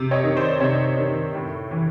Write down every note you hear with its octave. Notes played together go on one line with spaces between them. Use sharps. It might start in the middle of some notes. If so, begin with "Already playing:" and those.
Already playing: C3
C#5 D#5
D#3
C5 D5
C3 C#5 D#5
D#3
A2
E3